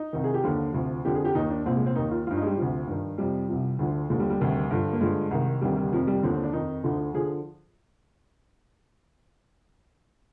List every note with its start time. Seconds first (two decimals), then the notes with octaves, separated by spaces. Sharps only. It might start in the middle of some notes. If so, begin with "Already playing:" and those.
Already playing: D#4
0.13 C2 C3 D#3
0.24 G#4
0.34 G4
0.44 D#2 D3 F3 F4
0.74 D2 C3 F3
1.05 F2 D3 F3 G4
1.15 G#4
1.25 G4
1.35 D#2 D#3 D#4
1.51 D4
1.65 C2 A#2 F3 C4
1.76 G#3
1.86 C4
1.95 D#2 D#3 D#4
2.11 F4
2.27 G2 F3 F4
2.37 D#4
2.42 G#3
2.46 G3
2.57 D2 C3 F3
2.87 G2 D#3
3.17 F2 C3 F3 G3
3.48 C2 C3 F3
3.79 D2 D3 F3
4.10 D#2 D3 F3 G#3
4.19 G3
4.30 G3
4.40 D2 C3 D#3
4.71 G2 D3 F3
4.92 A#3
5.00 G2 D3 F3 G#3
5.31 C2 C3 D#3
5.61 D2 C3 D#3 G3
5.77 G3
5.92 F2 C3 D#3 F3
6.07 G3
6.23 D#2 D3 F3 C4
6.33 C4
6.43 D4
6.53 F2 D#3 D#4
6.84 D2 D3 F3
7.14 D3 F3 G#4